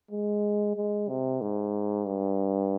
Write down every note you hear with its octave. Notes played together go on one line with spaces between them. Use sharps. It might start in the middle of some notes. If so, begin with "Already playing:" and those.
G#3
G#3
C3
G#2
G2